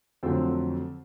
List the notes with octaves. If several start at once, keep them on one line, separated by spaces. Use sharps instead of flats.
F2 D3 F#3 A3 C4